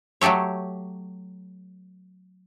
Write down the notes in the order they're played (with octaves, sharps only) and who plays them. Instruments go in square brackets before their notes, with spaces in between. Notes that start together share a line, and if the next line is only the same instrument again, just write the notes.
[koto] F#3 A3 G4 A4 C#5